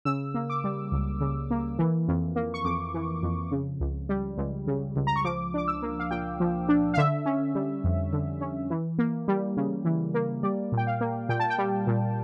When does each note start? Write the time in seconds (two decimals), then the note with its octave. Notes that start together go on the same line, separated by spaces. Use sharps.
0.05 C#3 E6
0.34 A#3
0.50 D6
0.64 G3
0.92 C#2
1.21 C#3
1.51 A#3
1.79 E3
2.08 F2
2.36 A#3
2.54 C#6
2.65 F2 D6
2.94 E3
3.23 F2
3.51 C#3
3.80 C#2
4.09 G3
4.38 C#2
4.67 C#3
4.96 C#2
5.07 A#5
5.16 C#6
5.25 F3 D6
5.54 D4 D6
5.68 E6
5.82 A#3
5.99 F5
6.11 A#2 G5
6.40 F3
6.69 D4
6.94 F5
6.97 D3 E5
7.26 C#4
7.55 G3
7.84 F2
8.13 D3
8.41 C#4
8.70 E3
8.99 A#3
9.28 G3
9.57 C#3
9.85 E3
10.14 A#3
10.43 G3 D5
10.72 A#2
10.77 G5
10.87 F5
11.01 A#3
11.29 A#2 G5
11.40 A5
11.50 G5
11.58 G3
11.87 A#2